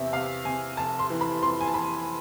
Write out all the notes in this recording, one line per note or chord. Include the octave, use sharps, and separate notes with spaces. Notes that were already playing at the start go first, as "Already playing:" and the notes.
Already playing: E2 C3 E5
C3 F5
C3 G#5
F1 A5
C6
E3
B5
F2 C6
G#5
A5
E3 B5